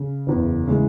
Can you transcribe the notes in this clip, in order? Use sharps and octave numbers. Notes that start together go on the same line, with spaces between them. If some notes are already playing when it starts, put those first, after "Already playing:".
Already playing: C#3
F#1 E2 C#3
C#3 E3 G#3